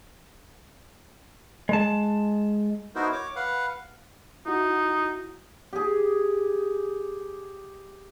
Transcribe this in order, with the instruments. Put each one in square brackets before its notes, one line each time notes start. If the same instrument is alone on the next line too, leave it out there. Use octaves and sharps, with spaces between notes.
[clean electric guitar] G#3 A5
[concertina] B3 D#4 E4 F#4 A#4 C5
C#5 D6
B4 F5 F#5
[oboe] D#4 [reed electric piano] E4 F#4
[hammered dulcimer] G4 G#4